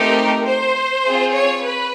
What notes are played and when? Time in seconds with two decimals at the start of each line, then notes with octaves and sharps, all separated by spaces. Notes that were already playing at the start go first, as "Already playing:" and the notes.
Already playing: A3 C4 D#4 G4 A#4
0.46 C5
1.05 C4 F4 G#4
1.34 C#5
1.64 B4